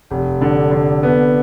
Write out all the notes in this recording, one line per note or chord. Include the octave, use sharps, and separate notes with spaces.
F1
D3
D3
B3